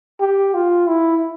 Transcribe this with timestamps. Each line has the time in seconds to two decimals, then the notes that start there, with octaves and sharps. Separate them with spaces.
0.20 G4
0.54 F4
0.88 E4